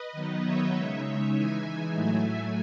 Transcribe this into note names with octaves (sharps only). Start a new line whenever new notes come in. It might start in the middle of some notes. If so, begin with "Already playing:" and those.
Already playing: B4 D#5
D#3 F#3 B3 D#4
C#5 E5
C#3 G#3 D#4
E3 G#3 D#4 E5 G#5
A2 F#3 A3 E5 G#5